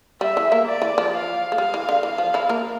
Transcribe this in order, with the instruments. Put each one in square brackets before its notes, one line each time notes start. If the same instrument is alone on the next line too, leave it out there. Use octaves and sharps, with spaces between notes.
[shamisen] G3 [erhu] E5
[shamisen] E3
A#3
[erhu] D5
[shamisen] E3
F3
[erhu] F5
[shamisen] A3
[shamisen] G3 [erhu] F5
[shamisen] E3
D3
[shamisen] E3 [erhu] F5
[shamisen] F3
E3 E4
A#3 A#4